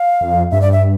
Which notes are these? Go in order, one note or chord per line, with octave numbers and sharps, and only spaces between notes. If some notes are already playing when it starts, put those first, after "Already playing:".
Already playing: F5
F2
G2 E5
D5
E5